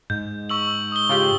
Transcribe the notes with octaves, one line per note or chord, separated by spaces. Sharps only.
G#2 G6
C#6 E6 F#7
D#6 G7
C#3 F4 G4